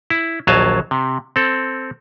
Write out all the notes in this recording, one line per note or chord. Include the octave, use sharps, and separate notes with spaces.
E4
A#1 D#2 F#3 F5 G#5 A5
C3
C4 A4